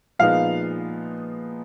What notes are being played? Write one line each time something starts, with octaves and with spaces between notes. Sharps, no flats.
A#2 F3 G#3 B3 D#4 F5